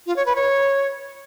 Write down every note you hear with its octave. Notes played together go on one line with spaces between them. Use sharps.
F4
C#5
B4
C#5